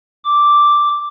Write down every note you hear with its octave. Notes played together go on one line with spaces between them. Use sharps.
D6